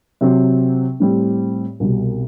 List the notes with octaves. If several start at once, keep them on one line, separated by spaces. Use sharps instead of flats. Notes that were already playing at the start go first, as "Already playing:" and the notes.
C3 F#3 C4
A2 G3 C4
C2 B2 G3